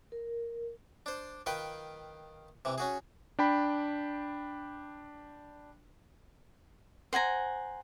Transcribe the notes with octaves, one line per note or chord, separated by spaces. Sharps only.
A#4
D4 C5
D#3 F4 B4 G5
C3 E3
C#4 F#4 G#4
D4 G5 B5
C5 F#5 G#5 A#5